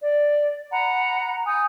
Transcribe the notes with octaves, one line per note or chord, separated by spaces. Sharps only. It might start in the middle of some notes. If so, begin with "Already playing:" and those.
D5
F#5 A#5 B5
G#5 D#6 G6